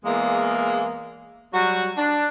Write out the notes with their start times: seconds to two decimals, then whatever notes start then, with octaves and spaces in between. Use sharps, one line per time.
0.05 E2 G#3 A#3
1.53 F#3 G3 F#4
1.97 D4